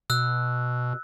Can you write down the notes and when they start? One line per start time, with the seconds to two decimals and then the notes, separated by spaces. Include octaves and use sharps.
0.10 B2 E6 F#6